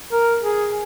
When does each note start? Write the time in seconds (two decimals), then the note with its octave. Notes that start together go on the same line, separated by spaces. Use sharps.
0.12 A#4
0.43 G#4